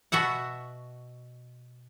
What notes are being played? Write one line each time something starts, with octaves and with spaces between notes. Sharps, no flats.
B2 F#4 E5 F#5